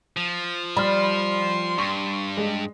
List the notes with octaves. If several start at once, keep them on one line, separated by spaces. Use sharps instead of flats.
F3
G3 B5 C6 F6
G2 C#6
G#3